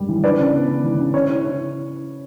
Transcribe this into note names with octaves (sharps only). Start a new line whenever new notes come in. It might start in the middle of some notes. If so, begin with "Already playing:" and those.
Already playing: F#2 G3
E3
D4 B4 D5
C#3
B3
B3
E3
C#3
C#3 C#5
E4
E4